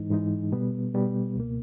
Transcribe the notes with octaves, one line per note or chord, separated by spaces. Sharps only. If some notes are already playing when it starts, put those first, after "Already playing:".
Already playing: G#2 E3 G#3 D#4
G#2 E3 G#3 D#4
B2 G3 B3
B2 G3 B3
C#2 B2 A#3